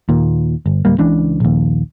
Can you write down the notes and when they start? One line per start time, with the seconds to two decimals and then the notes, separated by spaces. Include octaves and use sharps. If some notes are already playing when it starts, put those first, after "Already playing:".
0.09 D#2 A#2
0.66 G1
0.85 D1 G3 A#3
0.98 C#2 C#3 E3 D4
1.40 A#1 D#2